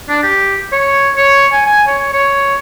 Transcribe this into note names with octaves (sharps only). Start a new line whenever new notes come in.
D4
G4
C#5
C#5
G#5
G#5
C#5
C#5